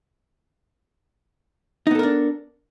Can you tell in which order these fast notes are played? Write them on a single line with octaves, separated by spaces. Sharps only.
D#4 B3 A4 A#4 D4